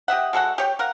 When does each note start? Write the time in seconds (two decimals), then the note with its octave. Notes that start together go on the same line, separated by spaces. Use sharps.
0.08 G4 D#5 E5 F#5
0.33 G#3 F#4 A4 F#5
0.58 G4 C#5 G5
0.79 A#4 F5 F#5